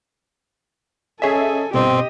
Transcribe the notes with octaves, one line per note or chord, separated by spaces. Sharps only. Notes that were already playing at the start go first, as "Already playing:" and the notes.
C#4 G#4 A4 C#5 D#5 E5 G#5
G1 B2 C4 G4 D#5